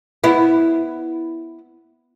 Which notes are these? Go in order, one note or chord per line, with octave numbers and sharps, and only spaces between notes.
B3 E4